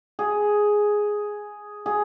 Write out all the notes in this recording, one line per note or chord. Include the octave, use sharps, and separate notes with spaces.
G#4
G#4